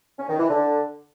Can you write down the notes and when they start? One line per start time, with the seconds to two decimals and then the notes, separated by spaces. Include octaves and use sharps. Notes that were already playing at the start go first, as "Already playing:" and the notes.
0.19 C#4
0.29 D#3
0.39 E3
0.49 D3